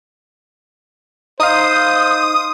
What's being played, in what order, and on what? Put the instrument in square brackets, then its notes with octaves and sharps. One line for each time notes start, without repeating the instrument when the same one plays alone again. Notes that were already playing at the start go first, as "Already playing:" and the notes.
[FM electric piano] D#4 D#5 F5 [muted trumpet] C5 [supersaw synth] D#6